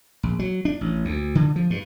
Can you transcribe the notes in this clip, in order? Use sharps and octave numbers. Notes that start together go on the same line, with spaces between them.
A#1
F#3
D4
A1
D2
D3
F3
G2